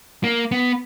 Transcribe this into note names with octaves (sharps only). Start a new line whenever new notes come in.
A#3
B3